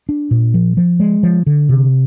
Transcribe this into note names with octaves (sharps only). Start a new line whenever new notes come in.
D4
A#2
F3
F3
G#3
F3
D3
C3